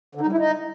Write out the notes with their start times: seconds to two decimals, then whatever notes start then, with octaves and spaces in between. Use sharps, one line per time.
0.15 D3
0.21 D#4
0.27 G3
0.32 E4
0.38 D#4